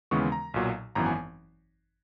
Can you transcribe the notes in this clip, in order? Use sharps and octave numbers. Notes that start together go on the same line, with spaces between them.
D#2 C#3 E3 G#3 B3 C#6
A#5
B1 A#2 F#3
G#1 F#2 E3 B3 A#5
G#5